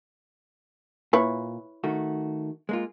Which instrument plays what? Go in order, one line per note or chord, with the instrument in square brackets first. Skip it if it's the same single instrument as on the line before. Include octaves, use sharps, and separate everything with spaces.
[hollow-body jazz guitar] A#2 [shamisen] E4 B4 C#5
[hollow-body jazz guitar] D#3 A3 F#4
G#3 A#3 F4